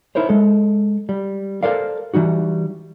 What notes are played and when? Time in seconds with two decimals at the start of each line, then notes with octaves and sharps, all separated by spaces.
0.15 D#4 E4 A#4 C5 C#5
0.29 G#3 A4
1.09 G3
1.63 A4 A#4 C5 D5 F5
2.14 E3 G3 D#4 F#4